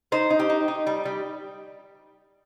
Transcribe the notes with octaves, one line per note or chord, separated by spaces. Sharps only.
D#4 C5
D#4
G4
D#4
D#4
G3
G3